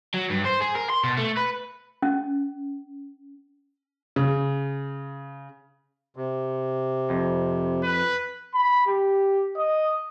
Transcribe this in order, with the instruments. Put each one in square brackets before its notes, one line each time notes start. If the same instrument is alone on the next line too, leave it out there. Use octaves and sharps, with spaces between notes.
[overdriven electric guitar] F#3
G2
C5
G#4
A#4
C6
B2
A3
B4
[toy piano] C#4
[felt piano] C#3
[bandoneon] C3
[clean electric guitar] F2
[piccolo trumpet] B4
B5
G4
D#5